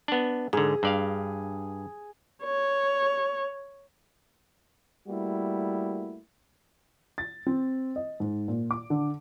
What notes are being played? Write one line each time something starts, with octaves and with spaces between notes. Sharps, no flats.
B3 D4
G#2 D3 G#4
G2 D5 F5
C#5
G3 A3 A#3 E4 F#4
A6
C4
D#5
G#2
A#2
D6
D3